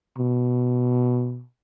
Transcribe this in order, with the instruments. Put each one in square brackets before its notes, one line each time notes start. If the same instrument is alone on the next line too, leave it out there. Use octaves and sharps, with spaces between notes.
[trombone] B2